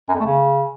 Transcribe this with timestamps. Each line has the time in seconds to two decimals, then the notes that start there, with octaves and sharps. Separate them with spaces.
0.09 F#2
0.15 F2
0.20 A3
0.26 C#3